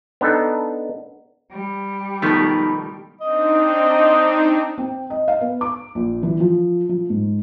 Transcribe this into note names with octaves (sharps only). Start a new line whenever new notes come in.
B3 D4 D#4 A4
G3
B2 D#3 F3 A3 B3 A#4
C4 D4 D#4 D#5
C4
D#5
F5
B3
D6
A#1
E3
F3
F3
G#2